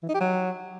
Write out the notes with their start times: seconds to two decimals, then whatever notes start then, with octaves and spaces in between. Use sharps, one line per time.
0.03 E3
0.09 D#4
0.14 G4
0.20 F#3